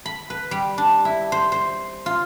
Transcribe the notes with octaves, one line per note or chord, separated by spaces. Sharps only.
B5
B4
G3
D4
E4
C5
C5
F4